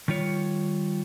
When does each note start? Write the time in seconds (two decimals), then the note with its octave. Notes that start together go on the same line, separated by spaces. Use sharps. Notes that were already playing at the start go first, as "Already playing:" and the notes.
0.08 D#3 G3 F4 C#5